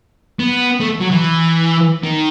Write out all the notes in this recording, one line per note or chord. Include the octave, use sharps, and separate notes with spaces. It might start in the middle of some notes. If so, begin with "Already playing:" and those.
B3
A3
F#3
E3
D#3